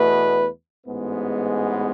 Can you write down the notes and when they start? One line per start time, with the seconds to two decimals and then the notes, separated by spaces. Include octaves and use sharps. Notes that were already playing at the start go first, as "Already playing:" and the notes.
Already playing: E2 B2 A3 B4
0.86 A1 G#2 G#3 B3